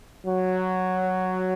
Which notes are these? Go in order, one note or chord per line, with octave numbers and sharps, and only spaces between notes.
F#3